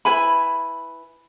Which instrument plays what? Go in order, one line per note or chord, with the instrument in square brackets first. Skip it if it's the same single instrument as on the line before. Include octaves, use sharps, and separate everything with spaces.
[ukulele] E4 B4 G#5 B5